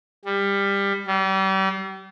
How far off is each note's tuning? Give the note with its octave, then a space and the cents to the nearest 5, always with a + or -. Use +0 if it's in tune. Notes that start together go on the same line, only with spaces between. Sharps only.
G3 +20
G3 -35